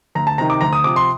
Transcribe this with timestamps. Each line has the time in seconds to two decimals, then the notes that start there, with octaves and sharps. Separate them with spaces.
0.15 D2 A#5
0.27 A5
0.38 C3 D#3 A#5
0.50 D6
0.61 D2 A#5
0.73 D#6
0.84 C3 F3 D6
0.96 C6